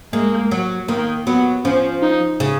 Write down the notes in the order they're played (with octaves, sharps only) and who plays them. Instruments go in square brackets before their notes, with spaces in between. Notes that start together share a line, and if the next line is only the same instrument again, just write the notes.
[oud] G#3 [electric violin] A#3
[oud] F#3
[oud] D#3 [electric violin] A#3
[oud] F#3 [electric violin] B3
[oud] F3 [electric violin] C#4
[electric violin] D#4
[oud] C#3